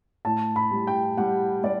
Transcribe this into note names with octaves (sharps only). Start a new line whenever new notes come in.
A2 A5
B5
G3
G5
G3 F#5
G3 D5